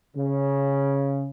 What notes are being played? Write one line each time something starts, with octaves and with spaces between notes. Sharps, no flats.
C#3